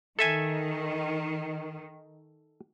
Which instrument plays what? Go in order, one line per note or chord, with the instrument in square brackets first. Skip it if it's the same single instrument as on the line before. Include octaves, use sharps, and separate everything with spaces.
[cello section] D#3 [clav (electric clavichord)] A4 E5 G#5